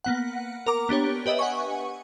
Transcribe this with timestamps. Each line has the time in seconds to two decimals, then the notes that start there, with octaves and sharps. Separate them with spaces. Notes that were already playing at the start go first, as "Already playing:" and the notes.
0.04 A#3 B3 F#5
0.66 A#4 A#5 D6
0.89 B3 D4 G4 C#5
1.26 G4 B4 D#5 E5
1.39 F#5 G#5 C#6